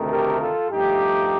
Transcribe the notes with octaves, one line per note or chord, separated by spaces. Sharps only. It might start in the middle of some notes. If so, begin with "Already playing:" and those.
Already playing: D2 C3 D#3 A3
G4 A#4
F4 A4
G2 F3 A3 D#4 G4